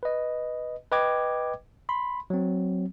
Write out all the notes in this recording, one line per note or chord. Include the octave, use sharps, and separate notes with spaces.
B4 D#5
B4 D#5 G5 D6 G#6
B5 C6
F#3 C4